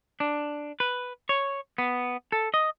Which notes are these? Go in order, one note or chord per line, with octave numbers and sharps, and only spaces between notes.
D4
B4
C#5
B3
A4
D#5